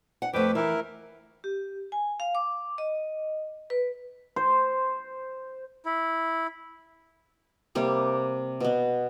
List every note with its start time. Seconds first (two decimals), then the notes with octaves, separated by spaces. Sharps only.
0.22 F#5
0.33 F2 A3 B4 G5 D6
0.55 E3 E4 A#4
1.44 G4
1.92 G#5
2.20 F5
2.35 D6
2.78 D#5
3.70 B4
4.36 C5
5.86 E4
7.75 C3 G3 A#3
8.60 B2 B3